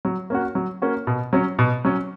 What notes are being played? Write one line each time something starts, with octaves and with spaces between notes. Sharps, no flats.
F#3
A#3 C#4 F#4
F#3
A#3 C#4 F#4
B2
F#3 C#4
B2
F#3 C#4